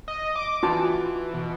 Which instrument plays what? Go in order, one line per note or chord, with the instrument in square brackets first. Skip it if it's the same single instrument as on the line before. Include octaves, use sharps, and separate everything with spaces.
[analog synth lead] D#5
D6
[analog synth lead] E3 [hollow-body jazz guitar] F4 F#4 A5
[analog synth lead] B2